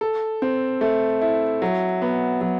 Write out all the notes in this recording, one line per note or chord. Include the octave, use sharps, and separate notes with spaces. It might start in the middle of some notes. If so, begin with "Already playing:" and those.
A4
C4
A3
E4
F#3
B3
F#3